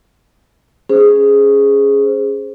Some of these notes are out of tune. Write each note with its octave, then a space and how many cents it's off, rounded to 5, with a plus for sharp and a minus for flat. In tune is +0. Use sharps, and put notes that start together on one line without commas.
C#4 +0 G#4 +0 C5 +0